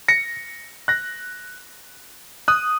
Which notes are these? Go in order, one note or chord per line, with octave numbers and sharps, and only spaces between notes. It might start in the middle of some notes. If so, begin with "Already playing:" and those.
A#6 C#7
F#6 A#6
D#6 F#6